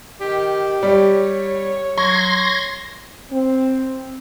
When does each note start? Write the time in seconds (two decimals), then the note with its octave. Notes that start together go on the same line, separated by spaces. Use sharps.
0.21 D#3 G4
0.83 G3 C#5
1.98 F#3 C6 C#6 G#6 A#6
3.31 C4